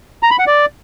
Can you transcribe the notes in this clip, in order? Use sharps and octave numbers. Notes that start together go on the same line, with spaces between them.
A#5
B5
F#5
D5